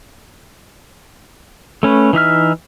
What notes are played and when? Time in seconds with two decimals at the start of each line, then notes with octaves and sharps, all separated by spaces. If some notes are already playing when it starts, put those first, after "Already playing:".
1.83 A3 C#4 B4
2.13 E3 D#4 E5 F6